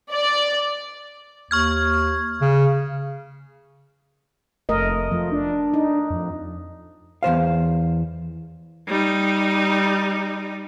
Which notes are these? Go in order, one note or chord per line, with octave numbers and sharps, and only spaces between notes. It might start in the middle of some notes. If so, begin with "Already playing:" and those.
D5
D#2 C#6 F6 G#6
C#3
F1 A3 A#4 D#5
F3 A3
D4
D#4
F2
E2 G#2 C5 F5
G3 D#4